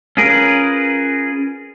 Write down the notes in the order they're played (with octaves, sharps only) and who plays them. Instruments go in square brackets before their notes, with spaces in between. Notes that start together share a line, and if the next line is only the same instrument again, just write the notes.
[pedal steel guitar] C#4 F4 G#4 A#4 B4